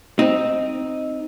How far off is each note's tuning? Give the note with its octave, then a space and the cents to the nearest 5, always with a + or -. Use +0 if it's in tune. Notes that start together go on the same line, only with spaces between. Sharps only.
C4 +0 D#4 +0